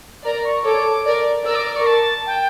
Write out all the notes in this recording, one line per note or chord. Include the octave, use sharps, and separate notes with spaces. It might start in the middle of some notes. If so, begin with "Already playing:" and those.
A#4 D5 A#5
C#6
A4 C#5 D6
A#4 D5
A#4 D5 E6
D6
D6
C#6
A5
G5